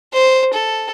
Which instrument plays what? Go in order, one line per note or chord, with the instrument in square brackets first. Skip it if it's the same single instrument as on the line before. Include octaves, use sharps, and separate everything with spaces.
[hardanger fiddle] C5
A4